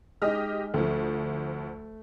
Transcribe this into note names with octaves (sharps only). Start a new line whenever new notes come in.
G#3 D#4 G4 D#5 F6
D2 F3 A3